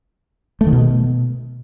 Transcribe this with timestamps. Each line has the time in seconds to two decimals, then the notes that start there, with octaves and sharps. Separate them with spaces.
0.61 A3
0.67 D#3
0.73 B2